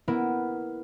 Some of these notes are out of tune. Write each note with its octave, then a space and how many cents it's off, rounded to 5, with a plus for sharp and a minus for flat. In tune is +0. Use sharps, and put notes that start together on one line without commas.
B3 +0 E4 +0 A#4 +0